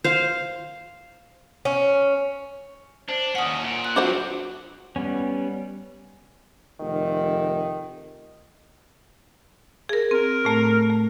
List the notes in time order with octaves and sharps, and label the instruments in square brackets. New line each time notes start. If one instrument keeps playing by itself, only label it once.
[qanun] C5 F5
[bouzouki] C#4
[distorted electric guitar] D4 [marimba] C5
[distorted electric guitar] D#2 C#4 [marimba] F#5 D#6
[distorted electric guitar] A#2
[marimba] F#6
[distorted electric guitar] F#3 C4 [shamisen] D4 C5 F#5 [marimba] F4 F#4
[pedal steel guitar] G3 B3 C#4
[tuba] F1 [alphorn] D#3
[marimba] G#4 A#4
[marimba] C4 [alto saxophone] A#4
[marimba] A2 A3 A#5
A3